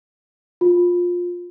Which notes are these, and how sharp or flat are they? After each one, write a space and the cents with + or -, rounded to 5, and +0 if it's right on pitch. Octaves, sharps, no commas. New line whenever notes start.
F4 +20